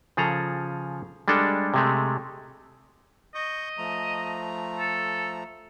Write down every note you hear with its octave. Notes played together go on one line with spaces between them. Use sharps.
C#3 F3 G#4 A4 A#5
G3 G#3 D4 A4
C3 G#3 A3
D#5 C#6 G6
F3 A3 A#5
A4